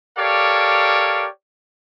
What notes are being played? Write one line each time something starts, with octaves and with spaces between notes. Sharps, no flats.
G4 A4 A#4 C#5 D5 F5